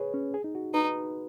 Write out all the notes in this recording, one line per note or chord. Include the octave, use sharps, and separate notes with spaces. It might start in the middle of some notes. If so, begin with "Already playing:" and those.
Already playing: G#4 B4 C#5
C#4
G#4
D#4
F#4
D#4 B4